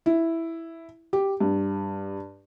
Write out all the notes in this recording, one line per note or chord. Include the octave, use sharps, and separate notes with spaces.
E4
G4
G2